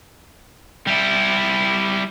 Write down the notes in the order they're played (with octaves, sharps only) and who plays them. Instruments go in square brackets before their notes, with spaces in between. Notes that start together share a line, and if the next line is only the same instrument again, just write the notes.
[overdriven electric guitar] G3 E4